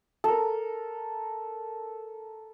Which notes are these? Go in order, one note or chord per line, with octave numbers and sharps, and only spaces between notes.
A4 A#4